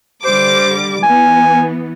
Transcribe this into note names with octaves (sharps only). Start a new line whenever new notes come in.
D3 G3 C5 D6
E3 B3 G#5